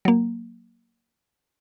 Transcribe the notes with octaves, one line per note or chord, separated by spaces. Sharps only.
F#3 A#3